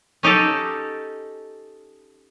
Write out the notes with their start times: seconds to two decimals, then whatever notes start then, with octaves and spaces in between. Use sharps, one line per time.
0.23 C#4 D#4 G4 A4